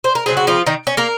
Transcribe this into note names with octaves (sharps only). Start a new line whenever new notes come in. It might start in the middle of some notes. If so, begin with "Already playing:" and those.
C5
A#4
C#3 F#3 C4 G#4
F#4
F3 F4
D#3 D#4
C#4
A#3 A#4